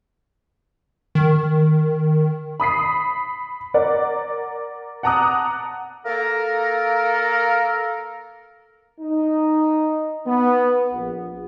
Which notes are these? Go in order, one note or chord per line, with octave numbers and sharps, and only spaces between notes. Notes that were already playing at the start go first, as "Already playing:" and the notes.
D#3
B5 D#6 B6 C7
A#4 D5 F#5
F#5 A5 A#5 D6 D#6 F#6
A#3 A4 A#4
D#4
B3
A#1